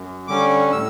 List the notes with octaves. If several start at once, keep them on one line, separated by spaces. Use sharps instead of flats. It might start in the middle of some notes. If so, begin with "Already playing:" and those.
Already playing: F#2
D3 G3 C#4 D6
A2 E6